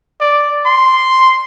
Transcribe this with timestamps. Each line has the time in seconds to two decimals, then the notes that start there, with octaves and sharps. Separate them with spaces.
0.21 D5
0.66 C6